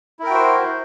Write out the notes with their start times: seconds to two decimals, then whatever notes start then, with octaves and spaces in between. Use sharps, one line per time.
0.19 E4
0.23 A#4
0.27 G5
0.30 F#4
0.34 C5